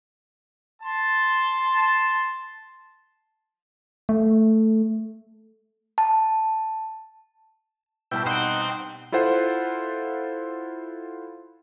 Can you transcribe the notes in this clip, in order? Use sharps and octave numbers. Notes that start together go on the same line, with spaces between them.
A5 C6
A3
A5
B2 G3 E4 G5 A5
D#4 C5 F#5 G5
E4 F4 A4 C5 F#5